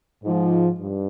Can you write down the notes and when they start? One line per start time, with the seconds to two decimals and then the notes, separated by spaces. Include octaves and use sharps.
0.22 G#2 F3
0.79 G2